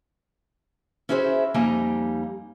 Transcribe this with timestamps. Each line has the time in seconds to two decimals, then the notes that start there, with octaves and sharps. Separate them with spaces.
1.09 C#4 E4 F#4 G#4 B4 C5
1.54 F2 G3 A#3 D#4 G#5 A#5